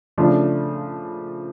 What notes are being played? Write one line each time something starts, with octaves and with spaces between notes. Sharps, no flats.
C#3 F3 A3 D4 F4